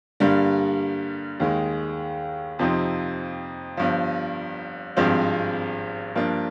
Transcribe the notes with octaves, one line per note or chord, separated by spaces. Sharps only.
G2 D3 G3 A#3
D#2 D#3 G#3
F2 C3 F3 C4 D#4
G1 G2 F3
G#1 G2 F3 G#3 C4
G2 F3 A#3 D4